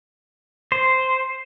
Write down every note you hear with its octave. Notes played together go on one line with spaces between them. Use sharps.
C5